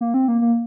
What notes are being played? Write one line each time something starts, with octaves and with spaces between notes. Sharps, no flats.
A#3
C4
A#3
A#3